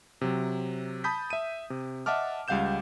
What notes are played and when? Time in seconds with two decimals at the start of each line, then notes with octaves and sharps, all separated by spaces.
0.21 C3 F#3
1.04 A5 B5 D#6 G6 B6
1.30 E5 D#7
1.70 C3
2.06 D#5 E5 F#5 A5 D6 F6
2.48 C#2 G3 F5 F#5 G6 E7